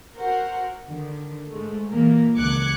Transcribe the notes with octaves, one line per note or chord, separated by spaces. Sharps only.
F#4 A#4 C5 F#5
D3 D#3
G#2 G#3 A3
A#2 E3 A#3 A#4
C#2 D#3 D6 F#6 G#6 C#7